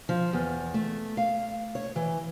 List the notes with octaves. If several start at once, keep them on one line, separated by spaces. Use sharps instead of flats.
F3
E2
A3
F5
C#5
E3